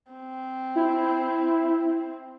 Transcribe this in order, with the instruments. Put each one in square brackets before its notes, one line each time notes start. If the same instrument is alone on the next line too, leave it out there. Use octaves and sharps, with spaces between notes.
[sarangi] C4
[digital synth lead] E4